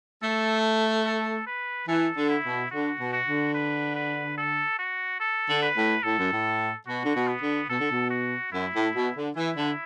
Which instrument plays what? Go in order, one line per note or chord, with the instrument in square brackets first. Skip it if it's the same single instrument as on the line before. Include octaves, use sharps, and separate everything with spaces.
[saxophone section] A3 [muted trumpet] A4
[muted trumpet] A4
B4
[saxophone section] E3 [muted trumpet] A4
[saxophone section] D3
[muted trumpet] E4
[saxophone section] B2
[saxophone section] D3 [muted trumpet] F#4
[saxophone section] B2
[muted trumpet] F#4
[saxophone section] D3
[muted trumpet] B4
B4
A4
F#4
A4
[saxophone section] D3
[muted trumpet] B4
[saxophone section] A2
[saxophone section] A2 [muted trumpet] A4
[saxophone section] F#2
A2
[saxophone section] B2 [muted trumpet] F#4
[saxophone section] D3
B2
[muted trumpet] B3
[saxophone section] D3
[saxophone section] B2 [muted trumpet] A4
[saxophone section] D3
B2
[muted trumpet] F#4
[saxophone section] F#2 [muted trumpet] E4
[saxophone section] A2
B2
D3
[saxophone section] E3 [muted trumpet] E4
[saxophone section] D3